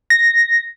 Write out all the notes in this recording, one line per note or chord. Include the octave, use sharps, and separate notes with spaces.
A#6